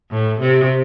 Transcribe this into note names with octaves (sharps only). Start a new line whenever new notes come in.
A2
C3